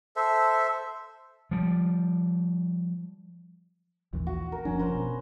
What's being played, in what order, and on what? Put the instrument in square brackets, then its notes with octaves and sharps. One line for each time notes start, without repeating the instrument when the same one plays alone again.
[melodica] A4 C5 E5
[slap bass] F3 G3
[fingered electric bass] A#1 D#2 E3
[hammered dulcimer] F#4
A#4
[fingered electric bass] F#1 F3 D4 [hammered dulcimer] C#4
[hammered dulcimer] B4 C5 A#5
[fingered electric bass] B2